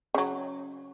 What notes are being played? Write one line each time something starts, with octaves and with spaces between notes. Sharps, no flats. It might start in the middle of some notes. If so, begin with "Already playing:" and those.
C#3 F#3